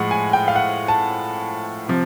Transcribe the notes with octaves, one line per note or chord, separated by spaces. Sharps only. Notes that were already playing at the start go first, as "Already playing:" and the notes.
Already playing: A2 F3 G#3 F#5
G#5
G5
F5
F#5
A5
C3 F3